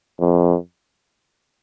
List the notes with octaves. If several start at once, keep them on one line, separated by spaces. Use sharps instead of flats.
F2